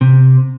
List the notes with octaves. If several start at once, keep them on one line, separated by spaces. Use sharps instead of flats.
C3